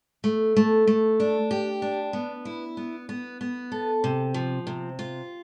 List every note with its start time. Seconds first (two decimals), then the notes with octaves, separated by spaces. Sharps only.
0.24 A3
0.56 A3
0.87 A3
1.20 D4
1.51 G4
1.82 D4
2.13 B3
2.45 E4
2.77 B3
3.09 B3
3.41 B3
3.72 A4
4.04 C3
4.34 F3
4.67 C3
4.99 F4